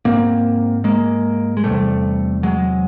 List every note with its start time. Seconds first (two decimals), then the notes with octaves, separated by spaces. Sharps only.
0.05 G#2 A#3 C4
0.84 G#3 A#3
1.57 G#3
1.64 E2 C3 G3 A3
2.43 F#3 G#3